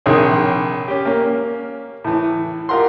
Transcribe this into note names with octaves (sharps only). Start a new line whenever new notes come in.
A#1 C3 D#3 G#4 C#5
C#4 G4
A#3 C#4
A2 E3
F4 G4 A#4 F#5 C6